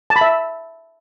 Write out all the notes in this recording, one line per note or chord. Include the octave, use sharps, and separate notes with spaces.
A5
B5
E5